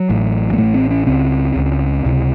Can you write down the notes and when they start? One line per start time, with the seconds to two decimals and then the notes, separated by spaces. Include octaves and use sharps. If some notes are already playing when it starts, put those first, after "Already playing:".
Already playing: F#3
0.09 A1 A2
0.53 A#3
0.58 A1 A2 A3
0.74 C4
0.91 C#4
1.06 C#2 C#3 C4
1.56 C#2 C#3
2.05 C#2 C3